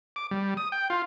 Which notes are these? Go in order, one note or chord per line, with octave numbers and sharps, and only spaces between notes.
D6
G3
D#6
G5
F4